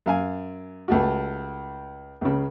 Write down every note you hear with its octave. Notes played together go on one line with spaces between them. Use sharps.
F#2 F5 G#5
C#2 A3 F#4
C#2 C#3